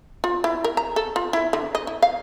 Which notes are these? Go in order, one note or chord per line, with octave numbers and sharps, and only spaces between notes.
F4
E4
A#4
A#5
A4
F4
E4
D3
D#5
E4
F5